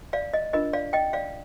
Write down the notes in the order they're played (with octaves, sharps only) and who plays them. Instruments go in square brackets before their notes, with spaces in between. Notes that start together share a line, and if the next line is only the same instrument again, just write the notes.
[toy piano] D5 F5
D#5
D4 F4 A#4 D#5
D5 F5
D#5 G5
D5 F5